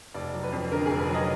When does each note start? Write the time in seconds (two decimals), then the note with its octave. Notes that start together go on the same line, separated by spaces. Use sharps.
0.14 F1 D5
0.33 F#3
0.43 B4
0.52 F2
0.72 D3 A#4
0.86 G#4
0.91 F1
1.00 B4
1.09 F#3
1.14 D#5